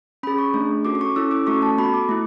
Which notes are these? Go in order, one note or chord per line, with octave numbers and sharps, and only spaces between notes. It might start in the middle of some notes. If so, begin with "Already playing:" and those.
C#4 G#4 B5
C#6
A3 D4 G#4
C#4 F#4 A4 D6
D6
C#6
C#4 E4 A4 E6
D6
A3 C#4 F#4 A4 C#6
A5
B3 F#4 A4 B5
D6
A3 E4